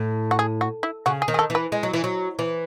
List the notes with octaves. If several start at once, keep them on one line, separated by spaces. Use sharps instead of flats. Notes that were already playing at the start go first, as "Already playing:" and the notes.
Already playing: A2
F#4
G#4
F#4
E4
C#3 F#4
G#4
D#3
G#4
A4
E3
B4
G#3
F#3
E3
F#3
E3